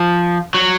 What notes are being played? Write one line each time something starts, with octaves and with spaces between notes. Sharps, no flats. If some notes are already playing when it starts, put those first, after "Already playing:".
Already playing: F3
F#3